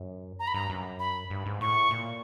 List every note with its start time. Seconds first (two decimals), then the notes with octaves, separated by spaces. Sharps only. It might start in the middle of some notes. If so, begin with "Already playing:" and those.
Already playing: F#2
0.40 A#5
0.47 B5
0.54 G2 A#5
0.70 F#2
0.99 B5
1.30 G2
1.46 G#2
1.61 A2 C#6
1.91 A#2